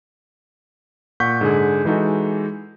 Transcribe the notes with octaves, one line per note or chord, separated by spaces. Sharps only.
A#2 F#5 C#6 G6 B6
G#2 D3 G#4
E3 G#3 D#4 F#4 A4